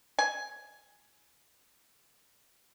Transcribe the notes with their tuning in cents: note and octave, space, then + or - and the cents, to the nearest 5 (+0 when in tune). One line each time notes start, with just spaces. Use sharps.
G#5 +10